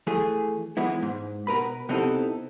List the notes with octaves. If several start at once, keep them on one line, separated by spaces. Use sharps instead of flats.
E3 A3 G#4
E3 G#3 B3 E4
G#2
B2 A#4 B4 B5
C3 B3 C4 D#4 E4 A4